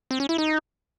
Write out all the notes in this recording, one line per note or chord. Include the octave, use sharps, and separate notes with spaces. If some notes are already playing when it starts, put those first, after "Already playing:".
C4
C#4
E4
D#4